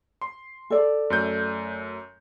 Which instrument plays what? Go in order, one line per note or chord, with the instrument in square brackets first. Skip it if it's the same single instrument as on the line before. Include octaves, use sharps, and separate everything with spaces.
[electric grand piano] C6
[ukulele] A4 D5
[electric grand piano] F#2 A3 G6